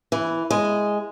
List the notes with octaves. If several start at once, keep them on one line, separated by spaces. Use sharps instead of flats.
E3
G#3